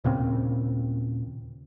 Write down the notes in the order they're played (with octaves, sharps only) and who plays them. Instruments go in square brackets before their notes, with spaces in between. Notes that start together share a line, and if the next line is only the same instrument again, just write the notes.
[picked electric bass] D#2 A#2 C#3 C4